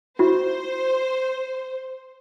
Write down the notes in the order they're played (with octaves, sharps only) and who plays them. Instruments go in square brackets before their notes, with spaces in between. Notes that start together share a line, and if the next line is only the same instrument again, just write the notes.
[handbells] E4 F#4 [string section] C5